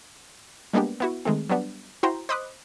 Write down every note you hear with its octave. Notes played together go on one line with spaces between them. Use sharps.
G3 G#3 A#3 B3 D4 G4
B3 E4 F#4
D#3 G#3 A3 C4
F#3 G3 B3 D4
E4 F#4 C5 G5 A#5 C6
C5 D#5 B5 D6 D#6 F#6